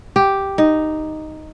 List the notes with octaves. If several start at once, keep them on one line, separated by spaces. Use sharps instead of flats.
G4
D#4